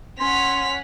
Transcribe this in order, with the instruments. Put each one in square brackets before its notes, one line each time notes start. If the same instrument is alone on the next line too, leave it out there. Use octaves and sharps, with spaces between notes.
[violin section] C#4 F#5 [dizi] C6 [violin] B6 F7